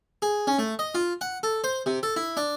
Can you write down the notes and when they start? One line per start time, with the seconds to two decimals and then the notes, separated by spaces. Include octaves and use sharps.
0.22 G#4
0.47 C#4
0.59 A3
0.79 D#5
0.95 F4
1.21 F#5
1.43 A4
1.64 C5
1.86 C3
2.03 A4
2.16 E4
2.37 D4